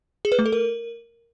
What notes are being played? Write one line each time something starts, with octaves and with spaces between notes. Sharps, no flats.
G#4
B4
A3
A4
A#4